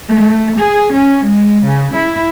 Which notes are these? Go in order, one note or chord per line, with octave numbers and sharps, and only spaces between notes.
A3
G#4
C#4
G#3
C#3
E4